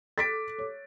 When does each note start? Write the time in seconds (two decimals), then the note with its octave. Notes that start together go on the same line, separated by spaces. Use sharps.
0.18 A4 D6 A6 B6 D7
0.58 C#5